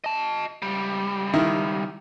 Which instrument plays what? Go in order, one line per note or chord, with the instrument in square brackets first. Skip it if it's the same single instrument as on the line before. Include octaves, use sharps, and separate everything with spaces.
[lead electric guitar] D#5 A5
C#2 G3
[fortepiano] D#3 E4